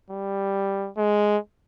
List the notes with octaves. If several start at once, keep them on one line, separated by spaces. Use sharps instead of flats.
G3
G#3